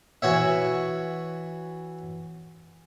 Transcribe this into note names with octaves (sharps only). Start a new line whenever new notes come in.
E3 F#4 C#5 E5